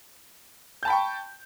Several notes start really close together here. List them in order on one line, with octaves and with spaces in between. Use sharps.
G6 A5 B5 G5 C#6